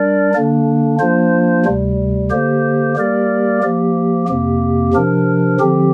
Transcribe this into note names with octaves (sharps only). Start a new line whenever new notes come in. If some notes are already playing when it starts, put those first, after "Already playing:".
Already playing: G3 D4 A#4 D5
D3 A#3 D4
F3 A#3 D4 F4 C5
D2 C3 G3
D3 A#3 G4 C5
G3 A#3 G4 A#4 D5
F3 A#3 G4
F2 C3 A#3 G4
C3 F3 D4 A#4
D3 F3 C4 G4